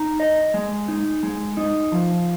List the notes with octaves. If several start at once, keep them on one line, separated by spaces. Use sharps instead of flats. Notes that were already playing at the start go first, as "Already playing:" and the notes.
Already playing: D#4
D#5
G#3
D#4
G#3
D#4
F3